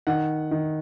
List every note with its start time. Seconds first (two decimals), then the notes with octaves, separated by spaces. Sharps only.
0.07 D#3 F#5
0.51 D#3